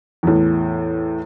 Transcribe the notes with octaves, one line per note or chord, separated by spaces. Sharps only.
E2 A2